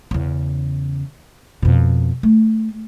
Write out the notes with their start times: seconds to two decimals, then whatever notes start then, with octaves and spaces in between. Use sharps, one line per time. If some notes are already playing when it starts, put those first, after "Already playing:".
0.11 E2 C#3
1.62 F2 B2
2.23 A3